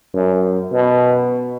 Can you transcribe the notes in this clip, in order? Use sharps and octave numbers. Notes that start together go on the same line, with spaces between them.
F#2
B2